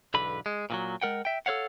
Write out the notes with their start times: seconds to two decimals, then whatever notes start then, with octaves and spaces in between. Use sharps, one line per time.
0.14 B1 E2 D3 B4 B5
0.46 G#3
0.70 A#2 D#3 F#3
1.01 G#3 A#4 F#5 G5
1.25 E5 G5
1.46 A4 B4 C#5 F5 F#5